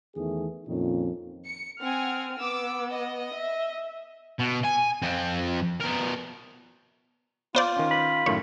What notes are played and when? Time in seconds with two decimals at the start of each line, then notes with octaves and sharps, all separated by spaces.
0.15 E2 D#3 A3 G#4
0.67 F2 A#2 D#3 C#4
1.44 C#7
1.79 C4 F#5 G#5 F6
2.40 B3 D6 E6
2.90 D#5
3.34 E5
4.39 B2
4.64 G#5
5.02 F2 C4
5.81 B2 A#4
7.55 B3 F4 C5 D5
7.77 D#3 C#4
7.91 B5
8.26 F#2 A2 D#3 C#5